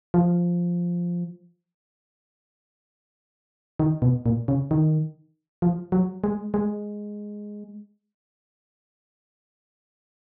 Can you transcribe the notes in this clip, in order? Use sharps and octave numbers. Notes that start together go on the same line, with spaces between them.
F3
D#3
B2
A#2
C#3
D#3
F3
F#3
G#3
G#3